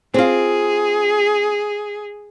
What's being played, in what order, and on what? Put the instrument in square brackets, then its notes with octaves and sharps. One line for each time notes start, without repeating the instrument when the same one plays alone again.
[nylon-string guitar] C4 F4 [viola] G#4